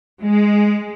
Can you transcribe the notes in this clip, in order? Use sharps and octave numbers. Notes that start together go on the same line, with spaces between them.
G#3